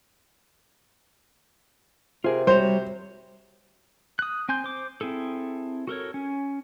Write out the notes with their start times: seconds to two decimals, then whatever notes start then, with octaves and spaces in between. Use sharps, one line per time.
2.24 C3 F4 G#4 A#4
2.47 G3 F#4 C5 C#5
4.19 D#6 F#6
4.49 C4 G#5 C6 G6
4.64 C5 D6
5.01 C4 E4 G#4 A4
5.87 F#4 A4 A#4 C#5
6.14 C#4